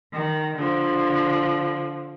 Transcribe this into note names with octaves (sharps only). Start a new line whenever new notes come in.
D#3
D3 F3